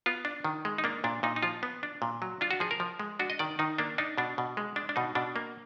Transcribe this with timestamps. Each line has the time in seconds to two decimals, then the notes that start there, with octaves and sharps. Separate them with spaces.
0.06 B3 F4
0.25 D4
0.45 D#3
0.65 G#3
0.78 D#4
0.84 A#3 D4
1.04 A#2 D4
1.23 A#2 D#4
1.36 D#4
1.43 F3 F4
1.63 B3
1.83 D4
2.02 A#2
2.22 F#3
2.41 D4 F4
2.51 F#4
2.60 F3 G#4
2.71 A#4
2.80 F3
3.00 G#3
3.19 D4 F#4
3.30 D#5
3.39 D#3 D5
3.59 D#3 D#4
3.78 A#3 D4
3.98 D4 D#4
4.18 B2 D4
4.38 B2
4.57 G#3
4.76 D4
4.89 D4
4.96 B2 D#4
5.15 B2 D4
5.36 A#3